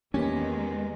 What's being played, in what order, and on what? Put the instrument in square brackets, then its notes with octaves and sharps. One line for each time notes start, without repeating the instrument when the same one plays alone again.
[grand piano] E2 G4 G#5 [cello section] D#3 G#3 [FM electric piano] A#3 B4 [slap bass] C#4